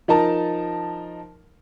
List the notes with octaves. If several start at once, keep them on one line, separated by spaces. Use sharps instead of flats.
F3 D#4 A#4 A5